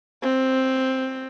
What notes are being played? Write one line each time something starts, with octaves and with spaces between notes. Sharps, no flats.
C4